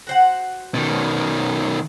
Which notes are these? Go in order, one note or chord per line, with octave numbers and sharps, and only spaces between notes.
F#4 C5 F#5
B2 D#3